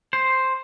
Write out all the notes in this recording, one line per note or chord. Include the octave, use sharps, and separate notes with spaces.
C5